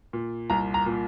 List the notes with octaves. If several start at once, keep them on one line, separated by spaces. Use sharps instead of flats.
A#2
C2 A#5
A#5
A#2